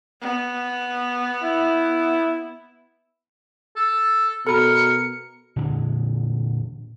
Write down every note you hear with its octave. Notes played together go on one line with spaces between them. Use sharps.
B3
E4
A4
B2 A4 A#4 B5 C#7
A#2 D3 E3 G#3